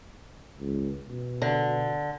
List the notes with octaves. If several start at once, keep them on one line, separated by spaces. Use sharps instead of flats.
C#2
B2
D3